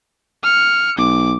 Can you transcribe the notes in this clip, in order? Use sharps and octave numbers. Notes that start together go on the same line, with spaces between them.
F6 C#7
B1 D6